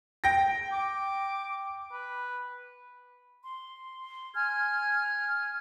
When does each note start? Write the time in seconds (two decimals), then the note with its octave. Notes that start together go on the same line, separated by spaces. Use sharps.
0.24 G5 A#6
0.73 D6
1.93 B4
3.43 C6
4.35 G#5 F6 G#6